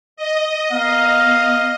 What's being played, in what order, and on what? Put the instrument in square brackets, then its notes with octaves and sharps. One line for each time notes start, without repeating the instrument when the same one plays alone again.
[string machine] D#5
[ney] B3 [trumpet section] A#4 F5